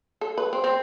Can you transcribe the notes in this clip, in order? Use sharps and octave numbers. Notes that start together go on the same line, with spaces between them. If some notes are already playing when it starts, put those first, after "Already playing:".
A4
B4
C4
C4